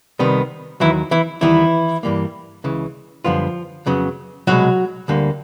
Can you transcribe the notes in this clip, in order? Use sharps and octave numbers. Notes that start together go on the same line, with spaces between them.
C2 C3 D#3 G3 B3
D#2 D#3 E3 F#3 E4
E3 E4
D#2 D#3 E3 G3 B3 E4
G2 E3 G3 A#3
C#2 C#3 E3
F#2 D3 F3 G3 B3 F4
F2 C#3 F#3 B3
C2 B2 F#3 G#3 F#4
D2 D3 G3 A#3